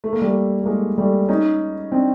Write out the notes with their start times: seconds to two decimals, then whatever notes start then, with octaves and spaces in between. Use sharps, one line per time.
0.04 A3
0.13 A#3
0.21 G3 A3
0.62 A3
0.66 G#3 A#3
0.98 G3 A3
1.28 C#4 D#4
1.91 C4 D4